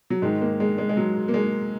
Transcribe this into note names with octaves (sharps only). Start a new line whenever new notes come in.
F#3
G#2 D#3 G#3
A#3
G#3
G#3
G#3
F#3
A#3
G#3